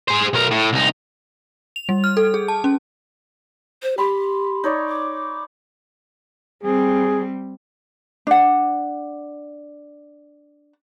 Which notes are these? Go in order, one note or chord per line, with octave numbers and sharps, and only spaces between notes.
G#4 C5
B1 A#4
A2
C2 D#4
F7
G3
F6
A4
G#4
A5
C#4
C5
G4 B5 C6
D#4 C#5 D5
D6
G3 C4 G#4
D4 F#5